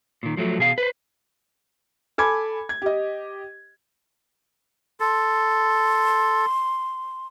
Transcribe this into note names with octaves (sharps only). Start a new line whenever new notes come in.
A#2 D#3
F3 F#3 A3
B2 G#4 F5
B4 C5
A4 G#5 B5 D6 G#6
G#6
G4 D#5
A4 C6